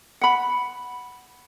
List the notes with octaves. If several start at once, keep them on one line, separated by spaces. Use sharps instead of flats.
F#5 B5